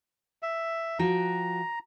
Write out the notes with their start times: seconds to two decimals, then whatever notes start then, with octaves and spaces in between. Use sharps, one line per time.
0.43 E5
0.99 F3 F#4 G5 A#5